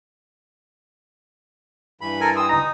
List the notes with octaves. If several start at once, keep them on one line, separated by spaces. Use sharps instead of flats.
G2 E3 B5
A4 A#4 G#5
G5 C6 D#6 E6
D2 D#4 A#5